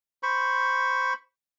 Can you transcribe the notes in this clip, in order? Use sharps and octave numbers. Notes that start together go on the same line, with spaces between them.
C5 B5 C#6